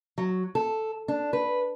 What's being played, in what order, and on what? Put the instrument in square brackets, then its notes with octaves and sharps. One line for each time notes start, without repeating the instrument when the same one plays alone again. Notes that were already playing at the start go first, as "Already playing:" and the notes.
[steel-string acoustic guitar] F#3
A4
D4
B4